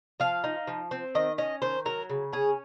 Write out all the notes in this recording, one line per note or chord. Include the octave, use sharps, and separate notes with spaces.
F3 F5
D#4
F3
C4
D#3 D#5
C#4 D#5
D#3 C5
F#3 A#4
C#3
C#4 G#4